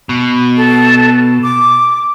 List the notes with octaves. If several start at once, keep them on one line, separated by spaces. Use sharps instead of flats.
B2
A4
D6